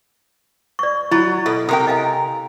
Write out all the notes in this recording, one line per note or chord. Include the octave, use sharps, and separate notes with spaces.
D5 C#6
F#3 E4 B5 C#6
B2 A4 E5
C3 A#4 G5 D#6
D#5 F5 G#5